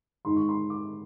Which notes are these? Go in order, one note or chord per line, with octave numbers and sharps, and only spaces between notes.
G#2 D#3 G#3 C6
C#6
C6
D6